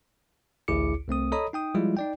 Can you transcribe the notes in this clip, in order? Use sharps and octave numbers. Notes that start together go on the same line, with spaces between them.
A1 D2 E4 G#4 D6 C#7
C2 A3 C4 D#6
A4 C#5 D#5 A#5 B5 D#6
D#4 G5 D#6
F3 G3 G#3 E4 F4
D#4 D5 G5